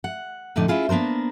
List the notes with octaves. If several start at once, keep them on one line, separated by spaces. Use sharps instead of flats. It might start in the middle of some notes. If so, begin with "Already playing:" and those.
F#5
F2 A2 D3 D#4 D5
C#4 E4 F4 G#4
A#3 B3 D4 A#4 C5